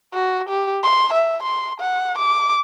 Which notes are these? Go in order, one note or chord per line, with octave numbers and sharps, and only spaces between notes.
F#4
G4
C6
E5
C6
F#5
D6